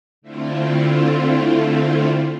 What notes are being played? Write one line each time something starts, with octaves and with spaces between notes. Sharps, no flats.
D3 A3 C4 E4 F4